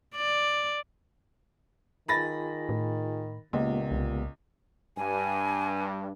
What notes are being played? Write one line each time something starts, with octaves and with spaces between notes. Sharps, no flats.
D5
D#3 F4 G#4 G#5 B5 A6 A#6
A2
C#2 A#2 G#3 A#3 B3 G4
C2
G2 G#5